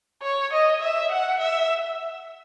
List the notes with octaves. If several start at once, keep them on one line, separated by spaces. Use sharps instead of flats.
C#5
D#5
E5
F#5
E5